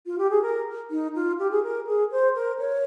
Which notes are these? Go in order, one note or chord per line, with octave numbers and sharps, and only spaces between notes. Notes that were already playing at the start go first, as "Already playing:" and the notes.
F4
G4
G#4
A#4
D#4
F4
G4
G#4
A#4
G#4
C5
A#4
C#5